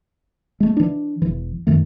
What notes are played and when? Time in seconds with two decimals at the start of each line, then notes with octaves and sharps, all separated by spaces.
0.60 G#3 A3
0.77 E3 D4
1.22 E1 E3
1.67 F#2 D#3 A3